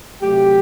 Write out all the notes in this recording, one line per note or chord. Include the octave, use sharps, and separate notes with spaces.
C3 F#3 A3 G4